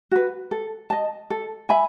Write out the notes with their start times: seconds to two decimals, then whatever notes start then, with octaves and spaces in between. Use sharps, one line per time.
0.11 F#4 B4
0.51 A4
0.90 D#5 A5
1.30 A4
1.69 E5 G#5 B5